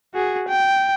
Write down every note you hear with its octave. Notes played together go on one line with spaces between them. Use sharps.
F#4 G#4
G5